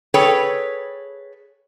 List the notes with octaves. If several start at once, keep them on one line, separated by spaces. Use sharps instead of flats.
G#4 A4 B4 C#5 G5